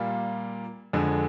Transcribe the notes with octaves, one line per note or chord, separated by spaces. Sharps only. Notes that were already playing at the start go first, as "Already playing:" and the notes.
Already playing: A#2 G3 A#3 F4
F2 D3 G#3